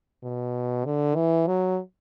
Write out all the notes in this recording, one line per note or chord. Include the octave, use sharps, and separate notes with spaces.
B2
D3
E3
F#3